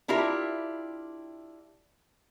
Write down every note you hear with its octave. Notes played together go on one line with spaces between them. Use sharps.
D4 E4 F4 G4 A#4 E5